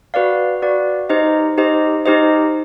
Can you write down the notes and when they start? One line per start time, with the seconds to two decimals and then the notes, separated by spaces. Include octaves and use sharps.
0.14 F#4 B4 D5 F5
0.62 F#4 B4 D5 F5
1.09 D#4 G4 C5 D#5
1.58 D#4 G4 C5 D#5
2.06 D#4 G4 C5 D#5